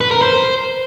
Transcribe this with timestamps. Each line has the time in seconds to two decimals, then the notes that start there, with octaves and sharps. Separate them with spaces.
0.01 B4
0.11 A#4
0.22 C5